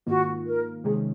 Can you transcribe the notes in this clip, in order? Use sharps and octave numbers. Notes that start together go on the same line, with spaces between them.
G#2 D#3 A#3 F4 F#4
A#4
C3 D#3 G#3 C#4 G#4